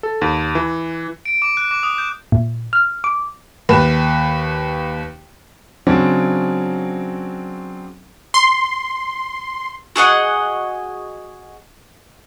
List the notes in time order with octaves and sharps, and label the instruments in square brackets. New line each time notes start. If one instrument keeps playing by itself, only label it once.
[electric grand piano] A4
D#2
E3
[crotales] D7
D6
F#6
D6
D#6
G6
[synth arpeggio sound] A#2
F6
D6
[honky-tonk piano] D#2 B4 E7
[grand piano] C#3 F#3 C4 D4
[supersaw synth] C6
[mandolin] F#4 G#4 D#5 F#5